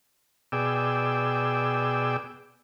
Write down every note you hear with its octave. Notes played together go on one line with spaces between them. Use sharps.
B2 G#4 D5 G5 E6